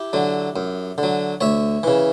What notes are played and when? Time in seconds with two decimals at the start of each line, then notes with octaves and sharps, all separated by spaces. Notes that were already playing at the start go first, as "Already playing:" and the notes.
Already playing: E4 G4
0.13 D3 F#3
0.56 F#2
0.98 D3
1.03 F#3
1.41 D2 C#5 E5
1.83 C#3 E3